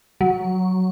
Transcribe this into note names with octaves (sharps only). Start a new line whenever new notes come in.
F#3